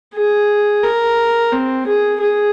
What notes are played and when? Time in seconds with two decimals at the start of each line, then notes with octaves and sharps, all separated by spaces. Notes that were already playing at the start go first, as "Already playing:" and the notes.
0.15 G#4
0.83 A#4
1.52 C4
1.87 G#4
2.21 G#4